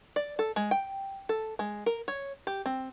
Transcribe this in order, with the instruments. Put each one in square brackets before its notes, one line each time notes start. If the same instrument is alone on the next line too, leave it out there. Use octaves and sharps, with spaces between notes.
[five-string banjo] D5
A4
G#3
G5
A4
G#3
A#4
C#5
G4
C4